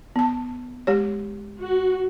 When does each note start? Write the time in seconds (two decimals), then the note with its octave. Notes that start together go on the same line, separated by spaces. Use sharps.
0.16 B3 A5
0.87 G#3 G4 C#5
1.60 F#4